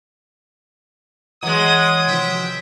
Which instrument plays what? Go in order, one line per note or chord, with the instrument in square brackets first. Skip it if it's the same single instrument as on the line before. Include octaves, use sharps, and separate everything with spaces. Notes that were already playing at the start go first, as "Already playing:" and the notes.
[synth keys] E3 D#5 D#7 [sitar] F#3 G#3 [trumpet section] D#6
[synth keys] C3 D#3 F3 [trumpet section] B4 E5 G5